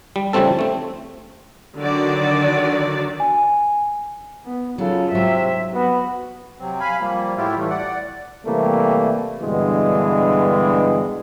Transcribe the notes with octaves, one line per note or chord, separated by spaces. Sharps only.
G3
C#3 F3 G3 A3 C4 A4
A3 C4
D3 D#3 F#3 F#4 D5
G#5
B3
C#3 F#3 F4 A4
G#2 C3 F#3 E5
B3 F#4
C3 F#3 C4
F5 G#5 B5
F3 G3 A#3
A2 F#3 E4 F4 G4
A2 E3 G3 A3
D5 F#5
C3 E3 G3 A3 A#3
G2 B2 D3 E3 G3 G#3